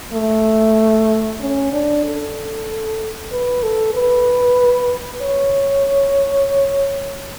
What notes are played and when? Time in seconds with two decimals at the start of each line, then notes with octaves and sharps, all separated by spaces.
0.13 A3
1.40 C#4
1.72 D4
2.04 A4
3.32 B4
3.63 A4
3.94 B4
5.22 C#5